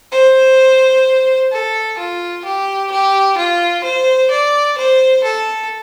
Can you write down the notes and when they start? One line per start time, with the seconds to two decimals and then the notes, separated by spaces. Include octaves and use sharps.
0.12 C5
1.52 A4
1.98 F4
2.44 G4
2.91 G4
3.37 F4
3.84 C5
4.30 D5
4.77 C5
5.23 A4